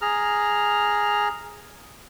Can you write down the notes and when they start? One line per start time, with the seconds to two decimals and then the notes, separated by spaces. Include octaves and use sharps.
0.02 G#4 A#5 F6